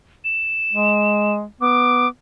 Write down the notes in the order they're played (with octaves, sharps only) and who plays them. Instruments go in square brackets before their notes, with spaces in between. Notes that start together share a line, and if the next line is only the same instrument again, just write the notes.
[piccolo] E7
[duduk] G#3
[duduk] B3 [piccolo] D6